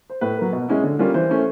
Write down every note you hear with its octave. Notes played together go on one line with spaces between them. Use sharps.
C5
A2 B4
F#3 A#3
B2
G#3 C#4 E4
D3
G3 A#3 C#4 F4
E3 C5
A3 C#4 E4